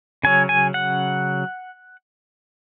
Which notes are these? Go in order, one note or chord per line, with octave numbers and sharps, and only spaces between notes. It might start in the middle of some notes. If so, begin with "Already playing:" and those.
C#3 F#3 C#4 G#5
G#5
F#5